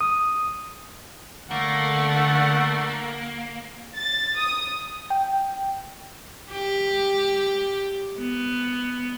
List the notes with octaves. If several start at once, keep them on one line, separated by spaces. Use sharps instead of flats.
D#6
D3 A3 A#3 F#5
A6
D#6
G5
G4
B3